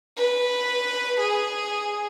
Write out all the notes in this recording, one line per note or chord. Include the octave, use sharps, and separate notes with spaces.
B4
G#4